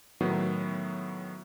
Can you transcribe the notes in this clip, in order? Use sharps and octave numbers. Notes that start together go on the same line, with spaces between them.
A2 D#3 F#3 B3